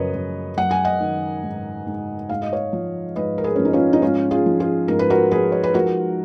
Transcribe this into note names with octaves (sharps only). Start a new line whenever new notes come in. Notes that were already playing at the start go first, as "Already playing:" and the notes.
Already playing: F#2 C#3 F3 G#4 B4 C#5 D#5
F#2
F#3 F#5
G#5
D#5 F#5
D#3
G#2
G#2
G#2 F5
D#5
C#5 F5
F3
G#2 B4 D#5
A#4
G#4 B4
F3 C#4
D#4
C#4 F4
D#4
G#2 C#4 F4
F4 G#4
F3
F4 G#4
G#2 A#4
B4
F#4 A#4
F3 G#4 B4
C#5
B4
F3 F#4 A#4